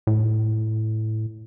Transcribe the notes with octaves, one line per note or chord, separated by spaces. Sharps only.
A2